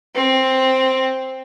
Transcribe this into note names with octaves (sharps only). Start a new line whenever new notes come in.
C4